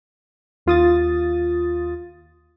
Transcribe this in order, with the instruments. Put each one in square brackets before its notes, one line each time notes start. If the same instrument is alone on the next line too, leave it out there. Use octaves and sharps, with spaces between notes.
[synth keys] D#2 F4 D#6 A6